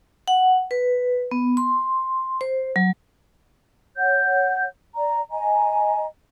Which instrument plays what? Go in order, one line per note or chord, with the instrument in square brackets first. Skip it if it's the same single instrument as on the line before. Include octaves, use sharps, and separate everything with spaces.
[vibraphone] F#5
B4
B3
C6
C5
F#3
[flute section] C#5 F#5 G6
D5 A#5
D#5 G#5 A#5